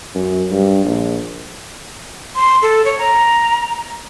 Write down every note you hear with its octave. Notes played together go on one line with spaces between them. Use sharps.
F#2
G2
A#1
C6
A4
C#5
A#5